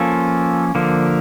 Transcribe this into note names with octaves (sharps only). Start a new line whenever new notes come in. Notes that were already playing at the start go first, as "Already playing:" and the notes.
Already playing: F3 A#3 C#4 F4 A4
D3 F3 A#3